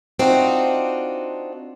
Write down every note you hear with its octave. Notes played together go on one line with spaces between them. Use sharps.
C4 D4 D#4 F4 F#4